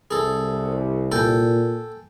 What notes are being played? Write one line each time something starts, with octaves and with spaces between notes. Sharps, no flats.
C2 G#4 A4
A#2 A4 G5 G#5